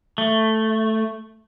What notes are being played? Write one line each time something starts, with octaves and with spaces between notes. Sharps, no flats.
A3